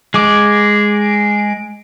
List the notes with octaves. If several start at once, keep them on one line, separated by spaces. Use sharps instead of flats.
G#3 D6